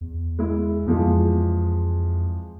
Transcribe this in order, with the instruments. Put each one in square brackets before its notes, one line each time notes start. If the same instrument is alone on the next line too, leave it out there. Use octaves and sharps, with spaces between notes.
[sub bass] E2
[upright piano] G#3 E4
[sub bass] F2 [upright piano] E3 F3 G#3